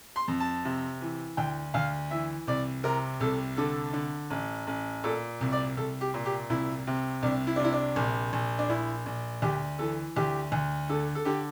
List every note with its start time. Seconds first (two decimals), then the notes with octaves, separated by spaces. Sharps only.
0.16 C6
0.28 F2
0.40 A5
0.65 C3
1.01 E3
1.37 D2 G5
1.74 D2 F5
2.11 E3 E5
2.47 C2 D5
2.84 C3 A#4
3.20 C2 A4
3.57 D3 A4
3.93 D3
4.30 A1
4.67 A1
5.04 A#2 A4
5.41 C2
5.52 D5
5.77 C2 A4
6.01 G4
6.14 A#2
6.25 G4
6.50 C2 E4
6.87 C3
7.23 C2 D4
7.47 E4
7.56 D4
7.60 C3 E4
7.73 D4
7.96 A#1
8.33 A#1
8.59 D4
8.69 A#1 E4
9.06 A#1
9.42 D2 G4
9.79 E3 A4
10.16 D2 G4
10.52 D2
10.89 D3 A4
11.15 A4
11.25 D3 G4